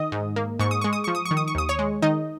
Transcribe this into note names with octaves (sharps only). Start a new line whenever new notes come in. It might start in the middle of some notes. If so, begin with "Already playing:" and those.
Already playing: D#3 D#5 D#6
G#2
A#3
G#2 C#6
D#6
G#3 C#6
D#6
F3 C#6
D#6
C#6
D#3
D#6
C#6
D#2 D#6
C#5 C#6
G#3
D#3 D#4 D#5